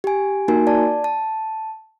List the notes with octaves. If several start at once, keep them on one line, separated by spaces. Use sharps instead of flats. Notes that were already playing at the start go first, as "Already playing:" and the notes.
G4 G#5
A#3 D#4 F#4 A#4 G#5
D5 A5
A5